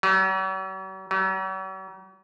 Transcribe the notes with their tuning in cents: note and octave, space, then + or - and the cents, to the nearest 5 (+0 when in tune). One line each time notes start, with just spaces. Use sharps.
F#3 +45
F#3 +45